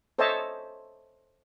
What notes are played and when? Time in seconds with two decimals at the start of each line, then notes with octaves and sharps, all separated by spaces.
0.18 A4 C5 C#5 D#5 E5 A5